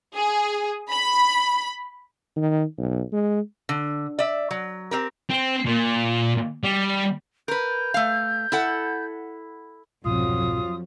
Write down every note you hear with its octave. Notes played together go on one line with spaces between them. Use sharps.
G#4
B5
D#3
B1
G#3
D3
D5 E5
F#3
C4 G4 A#4
C4
A#2
G3
A#4 B4 G6
A3 F5
E4 A4 F#5
C2 F2 G#2 B2 F#3 F4 D#6